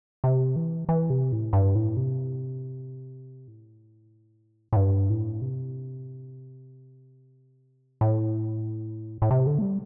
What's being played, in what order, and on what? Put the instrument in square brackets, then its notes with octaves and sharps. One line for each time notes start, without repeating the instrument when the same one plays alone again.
[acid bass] C3
E3
E3
C3
A2
G2
A2
C3
A2
A2
G2
A2
C3
A2
A2
C3
D3
A3
G3